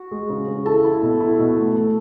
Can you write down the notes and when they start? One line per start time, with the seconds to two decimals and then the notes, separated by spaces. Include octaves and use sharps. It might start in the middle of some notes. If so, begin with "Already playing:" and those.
Already playing: F#4
0.11 G#3
0.30 C#3
0.48 C#3
0.66 E4 A4
0.84 E4
1.02 B2
1.21 E4
1.39 B2
1.57 A3
1.75 A3